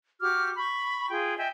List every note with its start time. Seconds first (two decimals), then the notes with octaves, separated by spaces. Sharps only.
0.21 F#4 G4 D6 F6
0.57 B5 C#6
1.10 F4 G#4 G5
1.38 D#5 E5 G5 G#5